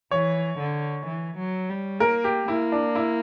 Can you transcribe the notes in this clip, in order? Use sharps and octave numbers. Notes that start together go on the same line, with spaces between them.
E3 C#5
D3
E3
F#3
G3
A#3 A#4
G4
A#3 E4
D4
E4